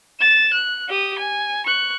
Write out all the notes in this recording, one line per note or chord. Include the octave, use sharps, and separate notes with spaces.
A6 E7
F#6
G4 D#6
G#5
C#6 F#6